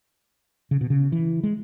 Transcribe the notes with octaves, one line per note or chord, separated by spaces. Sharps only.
C#3
B2
C#3
E3
G#3